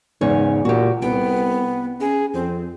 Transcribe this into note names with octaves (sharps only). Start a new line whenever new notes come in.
E2 G#2 C#3 C#5
A#2 F#4 G4
C2 B3 G5
C#4 G#4
F2 C4